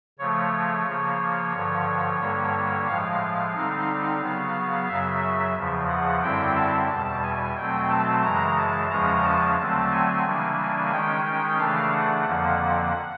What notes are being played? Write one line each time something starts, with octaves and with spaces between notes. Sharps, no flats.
C#3 F3 A3 C#5
C#3 F3 A#3
G2 D3 F3
G2 D3 G3 A#3
A2 F3 G#3 F5
D3 G3 C4 D#4
C#3 F#3 B3
F#2 C#3 F#3 E5
E2 C#3 F3
F#5
F#2 D3 G3 C4 E4 G5
A5
E2 B2 G3 A5
G#5
B2 F#3 A3 C4 G5
A5
F#2 C#3 E3 G#3 A#5
A5
E2 C#3 F3 G#3 C#4 A#5
A5
D3 F#3 A3 C4 A5
G#5
C#3 E3 G3 A#3 D4
D#3 G#3 C#4 G5
G5
C#3 E3 A3 D4 F5
F#5
F2 D3 F3 A#3